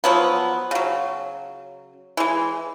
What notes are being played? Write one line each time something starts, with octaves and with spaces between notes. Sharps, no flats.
F3 F#3 B3
C#3 F#3
E3 G#3